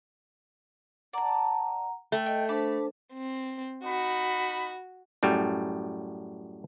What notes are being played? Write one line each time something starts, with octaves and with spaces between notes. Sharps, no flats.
D5 F#5 A5 A#5
A3 G5
D#5 G5
D4 C5 A5 B5 D6
C4
D#4 F#4 B5
F#2 A2 G3